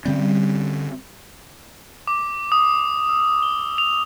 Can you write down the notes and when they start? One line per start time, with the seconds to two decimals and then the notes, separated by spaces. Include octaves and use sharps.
0.05 D3 G3 C4 C#4
2.07 D6
2.52 D#6
3.09 E6
3.43 G7
3.78 F7